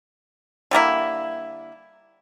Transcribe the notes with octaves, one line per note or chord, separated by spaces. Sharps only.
D3 G3 A#3 E4